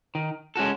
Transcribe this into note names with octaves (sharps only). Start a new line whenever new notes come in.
D#3
G#3 C#4 F#4 A4